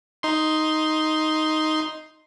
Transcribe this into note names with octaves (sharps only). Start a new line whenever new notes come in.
D#4 C6